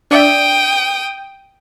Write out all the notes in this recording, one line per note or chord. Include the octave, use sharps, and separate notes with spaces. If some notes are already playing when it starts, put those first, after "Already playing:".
D4 D5 E5 G5 D#6